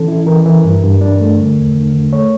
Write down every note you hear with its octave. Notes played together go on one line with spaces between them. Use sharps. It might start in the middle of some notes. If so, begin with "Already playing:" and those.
Already playing: E3 C#4 A4
E4
E3 A#4
E3
G2
G2
D4
A3
D3
E2
D3
D3
A3 C#5